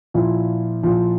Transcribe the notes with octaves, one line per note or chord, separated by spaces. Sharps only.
A#2 F3 E4
A#2 F3